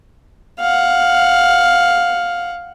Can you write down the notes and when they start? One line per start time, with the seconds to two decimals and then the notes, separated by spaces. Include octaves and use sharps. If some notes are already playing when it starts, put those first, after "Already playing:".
0.60 F5 F#5